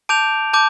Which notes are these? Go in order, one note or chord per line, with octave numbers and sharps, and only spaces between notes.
A5 D6 G6 D7 F7
A5 D6 G6